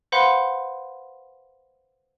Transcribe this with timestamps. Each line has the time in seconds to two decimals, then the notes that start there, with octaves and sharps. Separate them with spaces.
0.12 B4 C5 F5 F#5 B5 C6